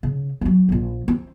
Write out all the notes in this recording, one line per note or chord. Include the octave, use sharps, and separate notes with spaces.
C#3
F3 F#3
E1 A#1
C4